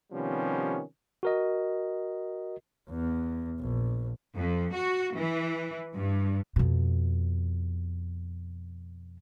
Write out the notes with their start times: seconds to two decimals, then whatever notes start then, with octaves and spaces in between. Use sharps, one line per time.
0.13 C3 D#3 F3 G3 B3 C#4
1.23 F#4 A#4 D#5
2.89 E2
3.59 A#1
4.36 F2
4.74 F#4
5.15 E3
5.93 G2
6.56 F2 B2